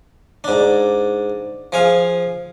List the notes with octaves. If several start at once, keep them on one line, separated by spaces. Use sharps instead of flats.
G#2 D4
F3 G#4 F5